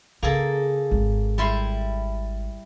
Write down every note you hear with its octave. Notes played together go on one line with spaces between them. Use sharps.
C#3 A#3 G#4 A4
G#1
G3 E4 C6